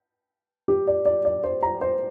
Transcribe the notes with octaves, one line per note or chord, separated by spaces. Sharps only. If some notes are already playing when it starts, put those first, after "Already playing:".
G4
D5
D5
D5
C5
A#5
C5